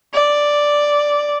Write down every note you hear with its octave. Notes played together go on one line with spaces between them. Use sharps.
D5